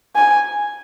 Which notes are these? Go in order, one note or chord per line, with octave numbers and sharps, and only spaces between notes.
G#5